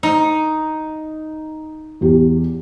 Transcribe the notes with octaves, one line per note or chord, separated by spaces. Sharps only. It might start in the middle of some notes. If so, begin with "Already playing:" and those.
D#4
E2 G4